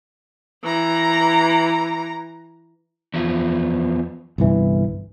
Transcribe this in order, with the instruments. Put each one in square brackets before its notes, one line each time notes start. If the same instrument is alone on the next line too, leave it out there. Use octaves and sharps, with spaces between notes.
[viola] E3 A#5
[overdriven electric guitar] E2 F3
[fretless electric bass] G1 C2 E3